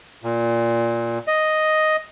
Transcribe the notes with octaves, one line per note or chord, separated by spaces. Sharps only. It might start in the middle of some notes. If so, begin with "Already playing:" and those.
A#2
D#5